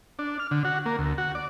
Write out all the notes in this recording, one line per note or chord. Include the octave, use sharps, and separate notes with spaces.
D4
F6
D3
F#4
A#3
D2
F#4
D5